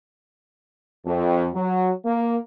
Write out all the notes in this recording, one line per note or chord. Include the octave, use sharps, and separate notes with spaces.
F2
F#3
A#3